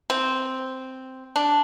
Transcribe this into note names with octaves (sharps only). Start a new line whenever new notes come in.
C4
D4